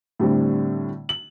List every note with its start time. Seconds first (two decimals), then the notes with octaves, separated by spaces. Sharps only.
0.20 A2 D3 G3 C4
1.09 F#7